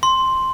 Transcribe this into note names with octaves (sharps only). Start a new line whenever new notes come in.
C6